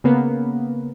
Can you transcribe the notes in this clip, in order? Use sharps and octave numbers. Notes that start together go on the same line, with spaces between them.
C#3 A#3 B3